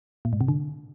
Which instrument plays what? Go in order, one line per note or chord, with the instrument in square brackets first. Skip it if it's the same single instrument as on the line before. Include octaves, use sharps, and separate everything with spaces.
[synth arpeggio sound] A#2
G#2
C3
D3